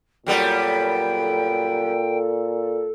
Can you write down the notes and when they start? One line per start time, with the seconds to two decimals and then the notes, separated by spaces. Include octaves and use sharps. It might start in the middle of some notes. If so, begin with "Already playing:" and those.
0.26 F#2 A#2 G3 B3 A4 G5